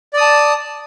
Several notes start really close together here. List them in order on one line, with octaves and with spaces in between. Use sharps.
D5 D#6 A5